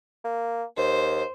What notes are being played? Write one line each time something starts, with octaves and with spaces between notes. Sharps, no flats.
A#3
D#2 C5